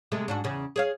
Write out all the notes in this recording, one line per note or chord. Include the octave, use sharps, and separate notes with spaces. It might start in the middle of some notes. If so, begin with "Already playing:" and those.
C3 G#3 A3
G#2 D4 F#4
E2 C#3
G#4 C#5 F5